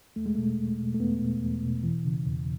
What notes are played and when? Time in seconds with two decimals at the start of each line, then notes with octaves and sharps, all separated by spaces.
0.16 E2 A3
0.26 G#3
0.35 B2 A3
0.58 E2
0.80 B2
0.94 A3
1.00 E2 B3
1.21 B2
1.43 E2
1.63 B2
1.84 E3
2.05 C#3
2.26 E2